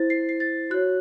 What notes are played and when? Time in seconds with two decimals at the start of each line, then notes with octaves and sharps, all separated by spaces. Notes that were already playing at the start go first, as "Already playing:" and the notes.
Already playing: E4 C5 A6
0.10 C7
0.29 C7
0.40 A6
0.70 F#4 C#5 F#6